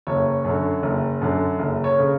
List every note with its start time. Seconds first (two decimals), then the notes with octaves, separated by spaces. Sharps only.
0.07 F#1 C#5
0.45 F#2 D3
0.83 F#1
1.21 F#2 D3
1.59 F#1
1.84 C#5
1.98 C#3